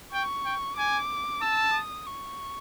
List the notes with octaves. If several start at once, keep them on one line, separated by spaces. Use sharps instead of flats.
G5 C#6
G5
G#5 D6
A5 E6
D#6
C#6